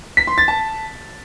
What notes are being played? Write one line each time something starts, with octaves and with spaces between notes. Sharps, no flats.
B6
C6
A6
A5